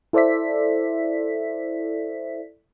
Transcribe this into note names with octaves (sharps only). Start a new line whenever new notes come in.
E4 A4 C5 D5 E5 B6